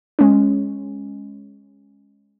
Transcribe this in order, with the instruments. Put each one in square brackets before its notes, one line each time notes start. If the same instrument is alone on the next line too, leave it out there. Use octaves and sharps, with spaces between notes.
[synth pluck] G#3 C#4